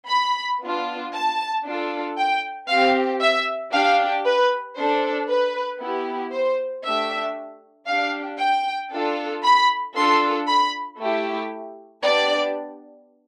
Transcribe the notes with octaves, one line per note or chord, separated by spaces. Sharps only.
B5
B3 D4 F4
A5
D4 F4 A4
G5
C4 G4 F5
E5
D4 G4 F5
B4
D4 A4 C5
B4
B3 E4 G4
C5
A3 D4 G4 E5
D4 G4 F5
G5
D4 F4 A4
B5
D4 F4 A4 C6
B5
A3 E4 G4
B3 D4 G4 D5